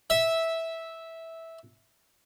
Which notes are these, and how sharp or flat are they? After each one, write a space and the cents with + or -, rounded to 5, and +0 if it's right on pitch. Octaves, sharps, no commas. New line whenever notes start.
E5 -10